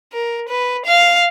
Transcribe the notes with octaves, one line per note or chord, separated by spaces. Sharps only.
A#4
B4
F5